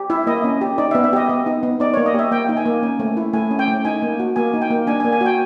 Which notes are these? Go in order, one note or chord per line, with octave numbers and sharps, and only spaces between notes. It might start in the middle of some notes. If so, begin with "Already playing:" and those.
Already playing: G4
E4 E5
A#3 D#5
C#4
G4
D#4 D5
B3 E5
E5
G4 D#5
B3
D#4
B3
D#4 D5
A#3 C#5
D#5
G4 E5
A#3 G5
D#4
G#5
A#3
C#4 G#5
A3
E4
A3 G#5
C#4
G5
A3
D#4 G#5
A#3
F#4
A#3 G#5
D#4
G5
A#3
D4 G#5
G#5
A#3
G#5
F#4 G5